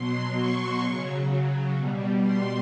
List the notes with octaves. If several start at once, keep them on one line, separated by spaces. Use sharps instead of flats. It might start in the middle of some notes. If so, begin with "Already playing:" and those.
Already playing: B2 F#3 C6
C#6
C#3 F#3
B2 G3
C6